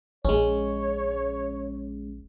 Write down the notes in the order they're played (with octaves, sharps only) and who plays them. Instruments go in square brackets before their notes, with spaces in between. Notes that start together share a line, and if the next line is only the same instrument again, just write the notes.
[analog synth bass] A#1 [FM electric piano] G#3 C#4 [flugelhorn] C#5